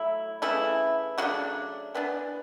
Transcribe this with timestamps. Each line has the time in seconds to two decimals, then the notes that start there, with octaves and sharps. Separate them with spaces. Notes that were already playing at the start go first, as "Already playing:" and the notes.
Already playing: F#3 A3 E4
0.42 C#3 E3 A3 E4
1.18 C#3 F#3 A3 D4 F#4
1.95 E3 B3 D4